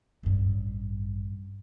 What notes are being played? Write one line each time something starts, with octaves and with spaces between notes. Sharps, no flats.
A1 G2